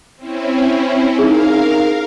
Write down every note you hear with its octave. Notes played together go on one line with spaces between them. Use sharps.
C4 C#4 E4
D#4 G#4 A#4 F5